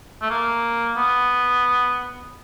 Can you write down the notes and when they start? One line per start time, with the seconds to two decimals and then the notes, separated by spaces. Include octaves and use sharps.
0.22 A3
0.30 A#3
0.97 B3